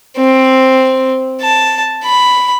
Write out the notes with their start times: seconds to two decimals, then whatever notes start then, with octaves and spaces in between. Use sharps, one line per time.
0.18 C4
1.42 A5
2.04 B5